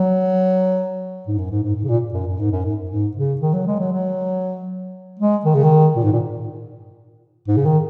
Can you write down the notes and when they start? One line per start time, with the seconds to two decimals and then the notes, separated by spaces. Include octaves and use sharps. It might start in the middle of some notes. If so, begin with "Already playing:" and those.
Already playing: F#3
1.27 G#2
1.38 F#2
1.51 G#2
1.64 G#2
1.76 G#2
1.84 C#3
1.89 A#2
2.14 F#2
2.27 F#2
2.39 G#2
2.52 F#2
2.65 G#2
2.90 G#2
3.16 C#3
3.41 D#3
3.53 F#3
3.67 G#3
3.79 F#3
3.92 F#3
5.19 G#3
5.45 D#3
5.55 C#3
5.64 D#3
5.96 A#2
6.04 G#2
6.12 A#2
7.48 G#2
7.57 C#3
7.66 D#3